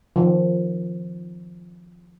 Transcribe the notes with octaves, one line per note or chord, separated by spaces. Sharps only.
D#3 F3